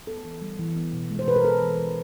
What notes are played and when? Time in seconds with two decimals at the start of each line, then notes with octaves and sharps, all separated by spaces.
0.07 B3 A4
0.25 E3
0.42 G3
0.59 E3
0.76 B3
0.93 B2
1.11 G#3
1.19 C5
1.27 B2 B4
1.36 A#4
1.44 B3 A4
1.61 E3
1.78 G#3